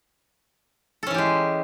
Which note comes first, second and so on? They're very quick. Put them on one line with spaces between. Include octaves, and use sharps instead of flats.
A4 C#4 E3 G4 G#3